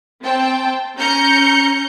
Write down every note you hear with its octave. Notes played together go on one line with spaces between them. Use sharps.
C4 G5 A5
C#4 A#5 G6 C#7